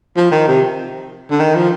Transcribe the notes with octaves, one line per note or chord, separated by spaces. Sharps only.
F3
D#3
C3
D3
D#3
F3